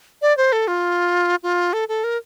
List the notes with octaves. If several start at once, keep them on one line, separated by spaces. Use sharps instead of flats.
D5
C5
A4
F4
F4
A4
A4
A#4